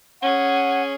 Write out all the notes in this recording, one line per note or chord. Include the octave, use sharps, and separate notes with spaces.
C#4 G#4 F#5